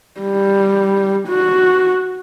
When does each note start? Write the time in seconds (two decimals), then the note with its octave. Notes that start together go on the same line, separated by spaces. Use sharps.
0.21 G3
1.28 F#4